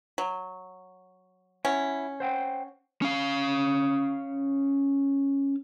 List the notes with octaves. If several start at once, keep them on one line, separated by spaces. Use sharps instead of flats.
F#3
C#4 E4 F#5
C5 F#5 G5
C#4 F5